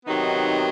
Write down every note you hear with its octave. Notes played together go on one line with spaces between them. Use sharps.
C3 D#3 F#3 B3 D#4